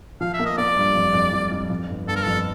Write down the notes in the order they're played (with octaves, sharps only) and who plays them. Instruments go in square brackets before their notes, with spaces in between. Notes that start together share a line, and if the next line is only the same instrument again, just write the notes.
[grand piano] F3 [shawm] F5
[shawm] E5
[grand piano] A#3
[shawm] D#5
[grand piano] A#3 [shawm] D5
[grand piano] G2
F2
F2
F2
F2
F2
G1
[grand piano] G1 [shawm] A4
[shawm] A#4
[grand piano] F2 [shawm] A4